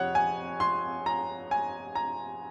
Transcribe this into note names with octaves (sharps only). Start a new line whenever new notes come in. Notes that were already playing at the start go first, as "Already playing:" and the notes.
Already playing: F2 C3 C#5 F#5
G#5
C6
A#5
G#5
A#5